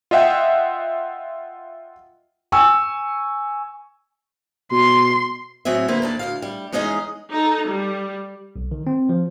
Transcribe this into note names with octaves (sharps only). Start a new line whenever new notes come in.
F4 D#5 E5 F#5 G5
G#5 C#6 E6
B2 C6
A2 F#3 C4 G#4 E5
D3 A#3 E4 B4 C5
D#2 D4 A5
D2 C3 F5
G3
E2 G#3 C#4 D#4 G#4 D#5
D#4 A4
G3
B1
D#3
C4
F3